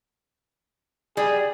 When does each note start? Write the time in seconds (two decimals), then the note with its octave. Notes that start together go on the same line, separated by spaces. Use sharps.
1.17 G3 G#4